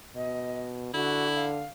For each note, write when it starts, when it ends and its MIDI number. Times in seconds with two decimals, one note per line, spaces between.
0.16 0.93 47
0.16 0.66 75
0.94 1.64 50
0.94 1.47 64
0.94 1.28 66
1.35 1.65 77